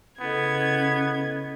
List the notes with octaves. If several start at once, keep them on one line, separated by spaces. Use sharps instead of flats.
C#3 B3 E4 A4 D#5 G#6